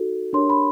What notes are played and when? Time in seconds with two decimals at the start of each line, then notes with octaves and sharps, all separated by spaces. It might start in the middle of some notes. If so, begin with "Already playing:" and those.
Already playing: D#4 F#4 A4
0.33 D4 G4 A#4 C#5 C6
0.50 B5